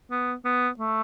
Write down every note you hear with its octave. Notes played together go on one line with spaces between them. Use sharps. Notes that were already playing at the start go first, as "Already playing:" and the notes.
B3
B3
A3